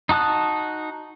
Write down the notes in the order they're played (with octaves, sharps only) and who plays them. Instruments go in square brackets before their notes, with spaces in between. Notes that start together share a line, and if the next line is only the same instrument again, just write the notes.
[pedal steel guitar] D#4 F#4 A5 D#6 F#6